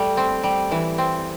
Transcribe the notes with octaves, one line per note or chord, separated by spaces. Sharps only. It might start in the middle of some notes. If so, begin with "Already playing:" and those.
Already playing: G3 A3
C4
G3
E3
C4